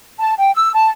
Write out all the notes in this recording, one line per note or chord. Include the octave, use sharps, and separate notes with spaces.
A5
G5
E6
A5